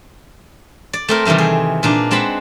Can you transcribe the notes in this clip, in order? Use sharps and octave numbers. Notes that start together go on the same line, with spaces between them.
D5
A3 C4 A#4
C3 D#3 E3 G3 A3
G#4
A#2 D4 D#4
G#3 C4 F#5 A5 B5